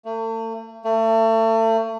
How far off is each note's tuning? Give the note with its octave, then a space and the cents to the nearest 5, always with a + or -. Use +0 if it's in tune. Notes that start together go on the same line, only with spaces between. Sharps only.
A3 +40
A3 +35